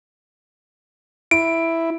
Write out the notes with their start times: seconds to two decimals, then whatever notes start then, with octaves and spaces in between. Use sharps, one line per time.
1.31 E4 D7